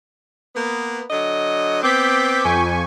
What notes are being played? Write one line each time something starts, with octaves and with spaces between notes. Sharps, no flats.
A#3 B3
D3 F#3 D#5
B3 C4 D6 G6 B6
F2 G#5 C#6